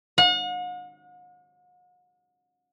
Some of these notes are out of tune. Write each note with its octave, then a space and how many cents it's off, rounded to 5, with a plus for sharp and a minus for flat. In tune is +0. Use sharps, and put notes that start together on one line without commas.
F#5 -45